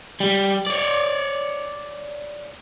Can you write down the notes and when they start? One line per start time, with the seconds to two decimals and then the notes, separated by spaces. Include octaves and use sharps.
0.20 G3
0.67 C#5 D5